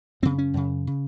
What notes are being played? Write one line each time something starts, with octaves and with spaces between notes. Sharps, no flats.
F#2 C#3 C4
C#4
F#2 C#3
C#3